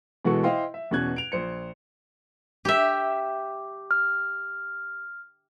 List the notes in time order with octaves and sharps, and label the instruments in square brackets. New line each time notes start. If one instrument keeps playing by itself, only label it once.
[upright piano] B2 E3 G#3 F#4 A4 C#6
E4 C5 D#5 F5 G5 C6
E5
E2 B2 C#4 F#6 G#6
D7 F7
A#1 C5 C#7
[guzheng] G4 E5
[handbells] F6